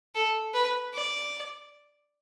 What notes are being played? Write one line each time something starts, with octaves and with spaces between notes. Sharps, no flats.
A4
B4
D5